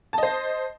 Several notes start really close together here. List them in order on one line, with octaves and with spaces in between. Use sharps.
A5 D#5 C5